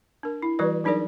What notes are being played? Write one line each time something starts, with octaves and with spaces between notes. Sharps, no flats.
D4 A#4
E4
E3 G3 F#4 B4 D5
F#3 D4 D#4 G#4 A#4 D5